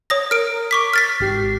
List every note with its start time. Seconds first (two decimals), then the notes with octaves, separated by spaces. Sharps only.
0.10 C#5 D#6 A#6
0.31 A#4 F6 D7
0.71 C#6 D6 B6
0.93 F6 A6 B6
1.20 G#1 G4 C7